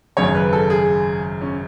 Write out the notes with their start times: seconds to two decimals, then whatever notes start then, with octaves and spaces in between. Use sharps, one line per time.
0.17 G#1 F#2 C#3 C#5
0.35 B4
0.53 A4
0.70 G#4
1.41 C#4